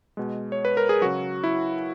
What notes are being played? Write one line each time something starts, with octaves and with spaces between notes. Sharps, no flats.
B2 G#3
C#5
B4
A#4
G#4
C#3 F#3 F#4
E4